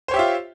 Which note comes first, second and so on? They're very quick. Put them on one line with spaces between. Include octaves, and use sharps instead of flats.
C5 C#5 G4 E5 F4